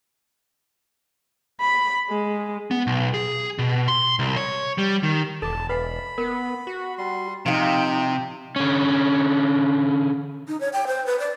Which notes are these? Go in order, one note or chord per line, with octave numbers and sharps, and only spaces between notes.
B5
G#3
B3
B1
G#4
B2
C6
C2
C#5
G3
D#3
E1 A4 A5 D6
B4 F#5 G#5 B5
B3 A#4
F#4
G3 C6
C3 F3 D#4 F5 G5
D3 C#4
D#4
C#5
G5
C5
B4
D5